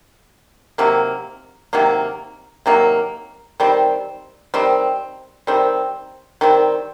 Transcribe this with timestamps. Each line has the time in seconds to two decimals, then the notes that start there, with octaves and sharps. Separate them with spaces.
0.78 C3 D#3 F#3 A#3
1.73 C3 D#3 F#3 A#3
2.66 C3 D#3 F#3 A#3
3.60 D#3 G3 C4
4.54 D#3 G3 C4
5.47 D#3 G3 C4
6.41 D#3 G3 C4